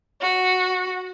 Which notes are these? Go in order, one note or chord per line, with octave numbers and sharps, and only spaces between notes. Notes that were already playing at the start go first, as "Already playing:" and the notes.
F#4